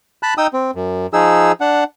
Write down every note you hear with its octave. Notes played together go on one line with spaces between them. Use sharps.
A5 B5 F#6
D#4 G5 D#6 E6
C4
F#2
F3 D#4 G#4 E6
D4 F#5